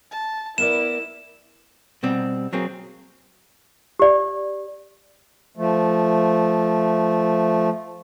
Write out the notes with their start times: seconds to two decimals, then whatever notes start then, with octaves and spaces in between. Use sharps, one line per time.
0.11 A5
0.58 B3 E4 A#4 D5 E7
2.03 B2 G3 C4
2.53 F#3 A#3 C4 G#4
3.99 G4 D5
5.57 F3 A3